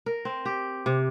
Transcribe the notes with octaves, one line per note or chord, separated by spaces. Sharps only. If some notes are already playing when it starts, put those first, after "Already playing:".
A#4
C4
G4
C3